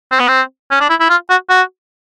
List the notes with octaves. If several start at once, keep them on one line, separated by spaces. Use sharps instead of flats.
C4
B3
C4
C#4
D4
E4
E4
F4
F#4
F#4